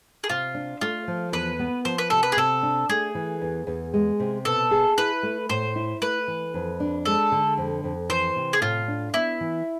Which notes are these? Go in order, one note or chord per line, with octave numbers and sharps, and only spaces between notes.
G#4
C3 F4
D4
A3 F4
F3
E2 B4
B3
F3 C5
B4
C3 A4
B4
G#4
C3 A4
D4
A3 G#4
E3
E2
E2
G#3
C3
B2 A4
G#4
E4 B4
A3
A2 C5
E4
A3 B4
E3
F2
D4
G#3 A4
D3
F2
F2
E3 C5
C3
G#4
A2 F4
D4
B3 E4
E3